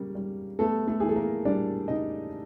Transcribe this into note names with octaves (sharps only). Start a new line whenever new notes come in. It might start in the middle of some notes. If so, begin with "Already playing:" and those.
Already playing: C#3 G3 A#3
G3
A3 B3 A4
A3 A4
E3 G#4
A4
A#3 A#4
G3 D4 D5
C#3 D#4 D#5